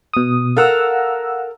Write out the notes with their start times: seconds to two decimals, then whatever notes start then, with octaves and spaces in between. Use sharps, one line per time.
0.14 B2 D#6
0.57 A4 A#4 F5 F#5 A#5 E6